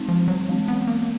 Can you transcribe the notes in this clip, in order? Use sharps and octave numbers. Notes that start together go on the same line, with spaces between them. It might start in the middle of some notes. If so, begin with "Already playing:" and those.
Already playing: G#3 C4 D#4
F3
F#3
E3 G#3 C4
B3
A#3